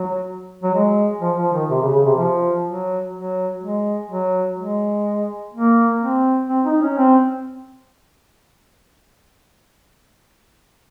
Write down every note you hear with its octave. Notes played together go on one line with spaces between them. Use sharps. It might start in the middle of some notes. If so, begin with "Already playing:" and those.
Already playing: F#3
F#3
G#3
F3
F3
D#3
C3
C#3
C#3
C3
F3
F#3
F#3
G#3
F#3
G#3
A#3
C4
C4
D#4
C#4
C4